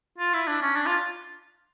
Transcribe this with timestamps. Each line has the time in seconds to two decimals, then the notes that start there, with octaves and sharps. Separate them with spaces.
0.18 F4
0.34 E4
0.48 D4
0.62 C#4
0.76 D4
0.86 F4